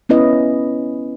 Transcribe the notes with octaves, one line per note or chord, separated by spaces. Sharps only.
B3 C#4 E4 B4 D#5